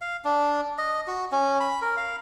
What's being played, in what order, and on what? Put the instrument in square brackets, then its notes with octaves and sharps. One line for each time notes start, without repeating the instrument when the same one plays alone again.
[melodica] F5
D4
D#5
F#4
C#4
B5
A#4
F5